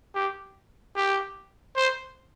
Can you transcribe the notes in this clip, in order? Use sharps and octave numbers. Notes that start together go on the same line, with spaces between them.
G4
G4
C5